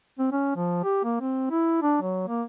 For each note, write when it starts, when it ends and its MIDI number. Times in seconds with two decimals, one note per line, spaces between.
0.19 0.28 60
0.32 0.52 61
0.55 0.79 53
0.84 1.03 67
1.04 1.15 58
1.20 1.49 60
1.51 1.78 64
1.82 1.97 62
2.02 2.23 54
2.27 2.43 58